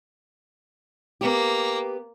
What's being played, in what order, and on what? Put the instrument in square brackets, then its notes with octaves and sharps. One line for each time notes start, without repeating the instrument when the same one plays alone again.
[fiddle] A#3 [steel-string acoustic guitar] B3 G4